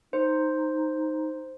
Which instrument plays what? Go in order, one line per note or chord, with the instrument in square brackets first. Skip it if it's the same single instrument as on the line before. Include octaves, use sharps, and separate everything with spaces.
[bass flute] D#4 [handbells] C5